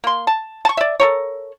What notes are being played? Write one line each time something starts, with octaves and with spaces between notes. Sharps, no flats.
A#3 C6
A5
A5 C#6
D5 E5
A4 A#4 C#5